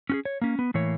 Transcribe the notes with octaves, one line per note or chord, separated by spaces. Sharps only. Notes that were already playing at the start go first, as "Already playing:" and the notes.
C#4 F#4 G#4
C#5
A#3 C#4
B3
A2 E3 A#3 C#5